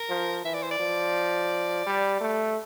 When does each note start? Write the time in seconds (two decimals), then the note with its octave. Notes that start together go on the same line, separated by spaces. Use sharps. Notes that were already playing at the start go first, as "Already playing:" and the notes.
Already playing: A#4
0.09 F3
0.45 E3 E5
0.54 D5
0.63 C5
0.71 D5
0.80 F3
1.86 G3
2.21 A3